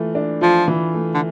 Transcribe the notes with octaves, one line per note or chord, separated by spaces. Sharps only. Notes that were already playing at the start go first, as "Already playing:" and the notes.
Already playing: E3 A3 F4
D4
F3 F4
E3
A3
D3